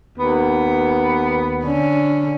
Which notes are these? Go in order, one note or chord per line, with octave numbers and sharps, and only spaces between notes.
D#2 B3
D3 C#4